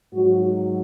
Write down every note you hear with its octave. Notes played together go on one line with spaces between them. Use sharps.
G#2 F#3 F#4